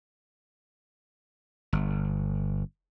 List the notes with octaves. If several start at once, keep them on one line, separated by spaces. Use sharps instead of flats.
G1